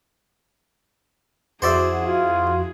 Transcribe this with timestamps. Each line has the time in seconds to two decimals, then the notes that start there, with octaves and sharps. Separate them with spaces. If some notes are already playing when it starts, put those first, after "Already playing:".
1.62 F2 E4 F#4 G#4 C5 D5 E5
2.04 F4